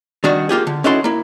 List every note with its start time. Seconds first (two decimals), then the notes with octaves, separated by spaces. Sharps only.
0.24 D#3 G3 D4 F#4
0.49 A#3 F4 G4 G#4
0.67 D3
0.84 C#4 D#4 E4 F#4 A4 C6
1.04 A#3 E4